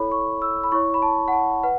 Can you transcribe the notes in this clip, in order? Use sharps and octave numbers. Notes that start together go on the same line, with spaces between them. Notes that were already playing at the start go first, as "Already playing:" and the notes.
Already playing: E4 A4 C#5 B5
C#6
E6
B5
E4 C#5 C#6
B5
A5
F#5
A5
B4 F#5